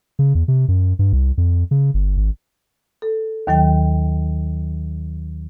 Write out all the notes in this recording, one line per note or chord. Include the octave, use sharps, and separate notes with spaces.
C#3
E2
C3
F#2
G2
C2
F2
C#3
G1
G#1
A4
D#2 D#3 F#3 G5